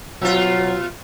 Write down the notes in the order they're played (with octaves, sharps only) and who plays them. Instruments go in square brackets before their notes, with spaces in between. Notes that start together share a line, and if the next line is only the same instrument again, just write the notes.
[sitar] B2 F4 [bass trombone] F#3